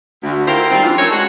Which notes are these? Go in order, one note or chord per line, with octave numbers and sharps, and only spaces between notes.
D2
E4 F4 G4 A#4 C5
D#3 G3 C4
E3 F3 D4 F4
A3 C#4 A4 A#4 C#5
G#3 F#4